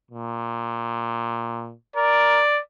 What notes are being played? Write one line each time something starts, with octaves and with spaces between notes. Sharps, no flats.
A#2
A#4 D5